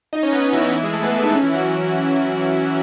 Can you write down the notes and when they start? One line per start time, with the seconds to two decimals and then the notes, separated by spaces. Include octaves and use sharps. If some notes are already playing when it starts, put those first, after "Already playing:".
0.13 D#4 D#5
0.23 C#4 C#5
0.32 B3 B4
0.43 D#4
0.53 E3 E4
0.63 D#4
0.73 E3 E4
0.83 G#3 G#4
0.93 A3 A4
1.03 B3 B4
1.13 A3 A4
1.23 D#4
1.33 C#4
1.43 E3 E4
1.54 F#3 F#4